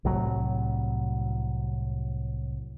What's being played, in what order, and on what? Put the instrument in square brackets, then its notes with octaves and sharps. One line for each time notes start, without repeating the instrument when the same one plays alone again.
[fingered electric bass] C2 A2 F#3